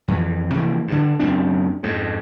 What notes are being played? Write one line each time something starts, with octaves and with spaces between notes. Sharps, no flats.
F2 E3
C3 E3 F3 A#3
G2 D3
F#1 F#2 C4 D4
F2 G#2